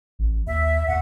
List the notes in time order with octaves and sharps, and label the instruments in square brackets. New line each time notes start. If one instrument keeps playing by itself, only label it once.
[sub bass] A1
[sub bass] D#2 [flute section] E5
[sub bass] E2 [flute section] F#5